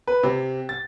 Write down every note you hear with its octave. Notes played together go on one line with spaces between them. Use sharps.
B4
C3
A6